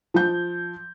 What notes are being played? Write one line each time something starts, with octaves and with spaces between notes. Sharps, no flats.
F3 G6